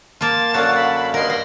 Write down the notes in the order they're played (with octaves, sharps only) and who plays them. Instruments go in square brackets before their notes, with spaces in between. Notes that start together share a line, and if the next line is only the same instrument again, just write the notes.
[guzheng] A#3 F4 [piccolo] A5
[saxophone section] F#2 D3 F5 [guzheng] F#4
[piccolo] B5
[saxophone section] G2 D#5 F5 [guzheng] A#4 [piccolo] C6
[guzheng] B5 C6 [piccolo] A#6